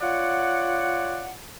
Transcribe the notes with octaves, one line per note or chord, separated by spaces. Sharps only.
F4 C#5 D5 F#5